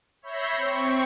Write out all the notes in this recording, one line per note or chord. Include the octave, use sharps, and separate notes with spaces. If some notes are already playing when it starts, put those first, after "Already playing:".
C#5 E5 B5 G6 A#6 C7
C4 C#6